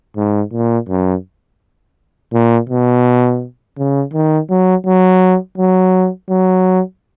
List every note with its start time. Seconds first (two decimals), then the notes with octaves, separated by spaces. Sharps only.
0.17 G#2
0.53 A#2
0.89 F#2
2.33 A#2
2.70 B2
3.78 C#3
4.13 D#3
4.50 F#3
4.86 F#3
5.58 F#3
6.30 F#3